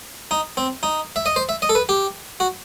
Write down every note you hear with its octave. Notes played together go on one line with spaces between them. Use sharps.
D#4
C4
D#4
E5
D#5
C5
E5
D#5
A4
B4
G4
F#4